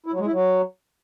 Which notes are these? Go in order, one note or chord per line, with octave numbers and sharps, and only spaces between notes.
E4
F#3
G#3
E4
F#3